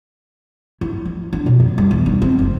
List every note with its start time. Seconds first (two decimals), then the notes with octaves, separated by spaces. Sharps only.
0.81 E4
1.05 F3
1.33 D4
1.46 B2
1.60 F#2
1.78 G3
1.91 E2
2.06 D#4
2.22 C4
2.39 F#1